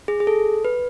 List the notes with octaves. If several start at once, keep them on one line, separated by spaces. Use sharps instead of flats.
G#4
G#4
A4
B4